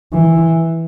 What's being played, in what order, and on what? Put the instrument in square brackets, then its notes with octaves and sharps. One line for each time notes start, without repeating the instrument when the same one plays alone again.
[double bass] E3